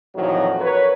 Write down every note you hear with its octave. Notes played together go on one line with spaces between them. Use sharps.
A#1 F2 D#3 E3 F#3
A#4 B4 C#5